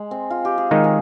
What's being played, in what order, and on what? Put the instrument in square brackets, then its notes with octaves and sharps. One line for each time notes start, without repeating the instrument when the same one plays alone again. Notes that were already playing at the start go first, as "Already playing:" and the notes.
Already playing: [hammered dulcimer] G#3
C4
F4
G4
G#4
[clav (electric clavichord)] D#3 G#3 D#4 [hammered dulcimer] A#4
[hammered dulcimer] G#4